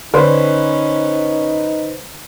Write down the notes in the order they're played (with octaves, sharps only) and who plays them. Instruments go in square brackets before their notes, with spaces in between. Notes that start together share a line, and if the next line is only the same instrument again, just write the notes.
[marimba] D3 D5 C6 [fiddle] C#4 [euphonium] D#4 [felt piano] B4 C5